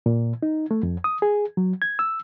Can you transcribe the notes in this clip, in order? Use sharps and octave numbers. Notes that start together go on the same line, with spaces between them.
A#2
D#4
A3
F2
D#6
G#4
F#3
G#6
E6